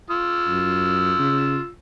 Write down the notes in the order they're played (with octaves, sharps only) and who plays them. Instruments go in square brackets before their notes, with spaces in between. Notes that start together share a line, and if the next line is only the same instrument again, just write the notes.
[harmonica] F4 E6
[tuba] F#2
C#3